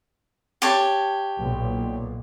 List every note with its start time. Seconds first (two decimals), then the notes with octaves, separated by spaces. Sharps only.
0.62 G4 C#5 A5
1.39 B1 A#2